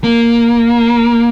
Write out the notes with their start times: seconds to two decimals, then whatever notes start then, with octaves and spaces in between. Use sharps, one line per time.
0.04 A#3